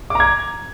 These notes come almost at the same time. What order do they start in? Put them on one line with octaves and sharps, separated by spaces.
D6 A#5 G#6